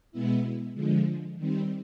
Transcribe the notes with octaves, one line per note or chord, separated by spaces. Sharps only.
B2 G#3 B3 E4
D3 F3 G#3
D#3 G3 C4